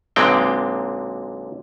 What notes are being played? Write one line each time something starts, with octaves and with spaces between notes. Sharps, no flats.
B1 A#2 D3 G#3 C4 G5